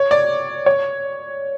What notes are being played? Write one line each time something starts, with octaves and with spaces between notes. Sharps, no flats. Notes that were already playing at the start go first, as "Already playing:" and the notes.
Already playing: C#5
D5
C#5